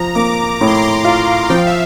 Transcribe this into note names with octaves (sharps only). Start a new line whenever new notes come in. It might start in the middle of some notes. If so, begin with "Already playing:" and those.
Already playing: F3 A#5
A#3 D6
A2 D6
C6
A#5
C6
F4 F5
F3 G5
F5
E5